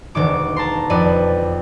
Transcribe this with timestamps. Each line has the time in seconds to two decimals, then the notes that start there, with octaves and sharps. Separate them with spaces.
0.15 E1 D2 D#3 D6
0.56 A5 A#5 C6
0.90 E1 F2 B4 D5 D#7